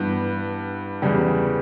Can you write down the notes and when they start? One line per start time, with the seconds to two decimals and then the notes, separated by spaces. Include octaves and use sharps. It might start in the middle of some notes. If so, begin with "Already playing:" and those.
Already playing: G2 E3 B3
1.02 E2 C#3 G3